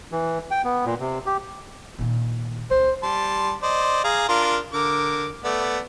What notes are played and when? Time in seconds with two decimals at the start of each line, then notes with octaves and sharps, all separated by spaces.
0.12 E3
0.51 G5
0.64 B3
0.85 A#2
1.00 C3
1.26 G4
1.99 A#2 D#3
2.71 C#2 C5
3.03 G3 A5 C6
3.63 C5 D5 D#5
4.04 G#4 F5 A#5
4.29 D4 F4 A#4
4.73 D3 A#4 D6
5.44 A3 B3 D5